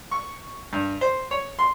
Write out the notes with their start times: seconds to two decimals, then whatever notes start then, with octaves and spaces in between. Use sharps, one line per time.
0.11 C#6
0.73 G2
1.01 C5
1.31 C#5
1.59 C6